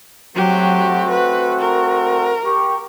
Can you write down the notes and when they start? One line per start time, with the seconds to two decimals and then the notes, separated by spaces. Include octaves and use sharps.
0.35 F#3 A3 C4 F#4 G4
1.11 B4
1.60 A#4
2.45 G4 C#6